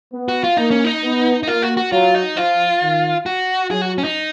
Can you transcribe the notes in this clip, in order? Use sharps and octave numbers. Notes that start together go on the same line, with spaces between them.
B3
F#4
F4
A#3 D#4
C#4
D#4
B3
D#4
A#3 F4
F#4
F#4
F#3 F4
D#4
F3 F4
D#3
F#4
F#3 G#4
F#4
C#4
D#4